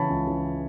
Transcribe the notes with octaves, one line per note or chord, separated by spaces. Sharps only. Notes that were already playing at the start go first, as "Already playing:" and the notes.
Already playing: C#3 E3 C#5 A5 B5
C#2
C#3 E3